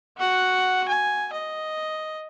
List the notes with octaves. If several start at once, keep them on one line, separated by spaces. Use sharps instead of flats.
F#4 F#5
G#5
D#5